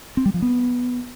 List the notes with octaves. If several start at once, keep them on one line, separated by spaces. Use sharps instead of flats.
C4
G3
F3
B3